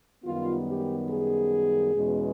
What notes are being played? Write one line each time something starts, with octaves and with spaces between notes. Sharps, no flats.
F#2 D#3 G3 B3 F4
G4
G#4
E2 B2 G#3 C#4